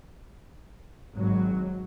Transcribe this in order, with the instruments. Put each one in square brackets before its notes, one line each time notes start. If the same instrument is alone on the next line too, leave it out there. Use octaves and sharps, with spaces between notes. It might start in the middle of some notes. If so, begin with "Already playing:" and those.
[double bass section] G#1 F#2 F#3